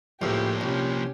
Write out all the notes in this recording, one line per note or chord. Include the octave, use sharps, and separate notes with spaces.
C#2 A2 F3 A#3 G4
C2 C#4 G4